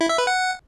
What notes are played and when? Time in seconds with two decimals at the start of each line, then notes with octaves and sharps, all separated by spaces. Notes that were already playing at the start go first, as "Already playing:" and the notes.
0.01 E4
0.09 E5
0.18 B4
0.27 F#5